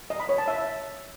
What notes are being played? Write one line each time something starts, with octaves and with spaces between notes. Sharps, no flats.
D#5
B5
C#5
A5
E5